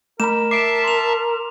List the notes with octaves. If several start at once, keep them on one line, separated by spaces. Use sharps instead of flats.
A3 A#4 A#5 B5 E7
E5 A5 D6 C7 D7
C6 F7